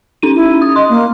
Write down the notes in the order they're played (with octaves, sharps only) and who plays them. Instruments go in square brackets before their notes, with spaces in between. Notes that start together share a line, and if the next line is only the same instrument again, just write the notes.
[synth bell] C#4 D#4 D#7
[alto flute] E4
[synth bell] D#6
[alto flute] D#5 [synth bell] C6
[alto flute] A#3